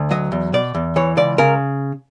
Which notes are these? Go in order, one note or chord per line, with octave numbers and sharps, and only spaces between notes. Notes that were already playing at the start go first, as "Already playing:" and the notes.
Already playing: D2
F#3 D#5
E2
B2 D5
E2
E3 C#5
C#2 D5
C#3 A#4